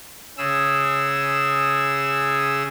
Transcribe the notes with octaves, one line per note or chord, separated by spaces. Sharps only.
C#3 G#4 E6